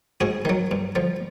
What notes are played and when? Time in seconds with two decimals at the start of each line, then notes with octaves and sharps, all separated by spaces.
0.21 G#2 F#4 G#4
0.45 D#3 F#3
0.71 G2
0.95 D3 F3